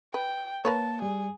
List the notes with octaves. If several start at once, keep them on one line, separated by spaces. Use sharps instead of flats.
B4 G5
A#3 A#4 B4 C#5 A5
G3 G#4